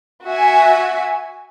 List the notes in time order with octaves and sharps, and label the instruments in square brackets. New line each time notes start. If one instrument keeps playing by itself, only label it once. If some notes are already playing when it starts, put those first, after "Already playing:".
[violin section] F#4 E5 G#5